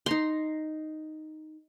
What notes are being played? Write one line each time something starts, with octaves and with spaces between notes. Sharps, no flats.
D#4 A#5 C6